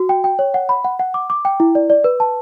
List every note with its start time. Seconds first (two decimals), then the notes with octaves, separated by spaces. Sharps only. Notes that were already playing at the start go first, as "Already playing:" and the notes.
Already playing: F#4
0.09 G5
0.24 G5
0.39 C#5
0.54 F#5
0.69 B5
0.85 F#5
0.99 F#5
1.14 D6
1.30 D6
1.45 G5
1.60 E4
1.75 D5
1.90 D5
2.04 B4
2.20 A5